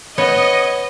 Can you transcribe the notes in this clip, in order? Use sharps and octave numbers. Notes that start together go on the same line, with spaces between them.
B3 C#5 D#5